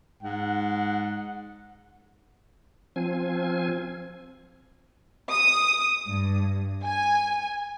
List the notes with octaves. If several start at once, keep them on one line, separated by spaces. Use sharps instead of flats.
G#2 F#5
F3 C4 G#5
D#6
G2
G#5